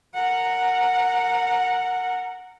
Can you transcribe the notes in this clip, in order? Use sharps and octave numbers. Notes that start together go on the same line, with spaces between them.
A#4 F#5